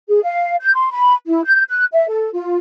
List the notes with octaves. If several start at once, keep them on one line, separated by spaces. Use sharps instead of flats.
G#4
F5
G6
C6
B5
E4
G6
F#6
E5
A4
F4